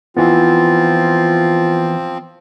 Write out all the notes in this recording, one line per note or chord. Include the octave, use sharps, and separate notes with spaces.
E3 F3 B3 C4 F4